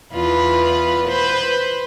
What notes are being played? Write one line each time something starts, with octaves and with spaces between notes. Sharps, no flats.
E2 F4 B4
B4 C5